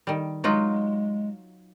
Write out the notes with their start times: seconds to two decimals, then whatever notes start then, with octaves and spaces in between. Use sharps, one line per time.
0.07 D#3 G3
0.44 F#3 G#3 D#4 F4